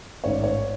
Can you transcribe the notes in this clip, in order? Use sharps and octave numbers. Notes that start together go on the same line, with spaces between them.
A1 G#2 D#3 C#5
D5
C#5